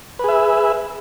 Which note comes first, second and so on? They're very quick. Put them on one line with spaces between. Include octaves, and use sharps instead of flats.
B4 G#4 E5